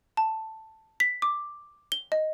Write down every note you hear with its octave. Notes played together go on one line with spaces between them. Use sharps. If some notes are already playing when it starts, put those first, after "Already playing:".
A5
B6
D6
G7
D#5